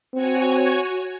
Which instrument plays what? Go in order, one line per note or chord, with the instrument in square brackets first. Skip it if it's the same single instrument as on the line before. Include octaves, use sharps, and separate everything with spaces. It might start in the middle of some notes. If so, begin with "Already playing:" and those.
[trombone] C4 [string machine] F#4 C#5 G#5